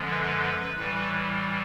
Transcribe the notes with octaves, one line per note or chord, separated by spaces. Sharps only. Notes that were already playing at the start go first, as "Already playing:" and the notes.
Already playing: F#2 D3 F3 G#3
B4
A2 E3 G3 B4